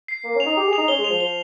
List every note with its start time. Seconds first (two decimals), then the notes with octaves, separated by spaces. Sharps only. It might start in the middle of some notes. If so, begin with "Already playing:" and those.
0.08 C7
0.24 A#3
0.35 C#4
0.40 F7
0.46 D#4
0.57 G4
0.67 G#4
0.73 D#4 F7
0.88 C#4 G7
0.98 G#3
1.04 F7
1.10 F3
1.20 F3 G7